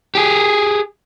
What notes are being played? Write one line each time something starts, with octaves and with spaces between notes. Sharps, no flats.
G4 G#4